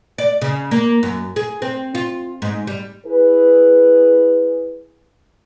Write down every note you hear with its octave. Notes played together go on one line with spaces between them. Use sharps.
D5
C#3
A#3
F#2
G#4
C4
F4
G#2
G3
E4 G#4 B4